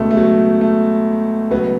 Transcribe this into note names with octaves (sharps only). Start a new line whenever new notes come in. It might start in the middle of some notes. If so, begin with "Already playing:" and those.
Already playing: C#2 B2 A3
A3
F#3
A3
C#2 B2 F#3 B3